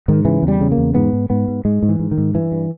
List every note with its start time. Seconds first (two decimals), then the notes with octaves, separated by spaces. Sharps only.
0.08 G#2 D#3
0.25 C#3 E3
0.42 E2
0.48 G3
0.61 C#3
0.72 A#3
0.78 E2
0.94 G#2 B3
1.13 G#2
1.30 G#2 B3
1.48 G#2
1.65 G#2 G#3
1.83 G#2
1.89 E3
1.99 G#2
2.11 D#3
2.18 G#2
2.35 G2 E3
2.52 G2